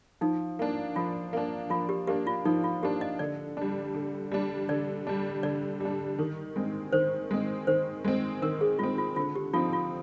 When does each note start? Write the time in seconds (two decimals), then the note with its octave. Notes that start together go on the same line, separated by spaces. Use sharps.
0.21 F3 D#4
0.59 A#3 D4
0.96 F3 F4
1.33 A#3 D4
1.70 F3 F4
1.89 G4
2.07 A#3 D4 G4
2.27 F4
2.45 F3 D#4
2.64 F4
2.82 A#3 D4 G4
3.01 D#5
3.19 D3 D5
3.57 G3 D4
3.95 D3
4.32 G3 D4
4.69 D3 D5
5.07 G3 D4
5.43 D3 D5
5.80 G3 D4
6.19 D#3
6.56 G#3 C4
6.93 D#3 C5
7.31 G#3 C4
7.67 D#3 C5
8.05 G#3 C4
8.42 D#3 A#4
8.61 G#4
8.79 G#3 C4 F4
8.98 F4
9.16 D3 F4
9.35 G4
9.53 F3 F4
9.56 C4 D#4
9.73 F4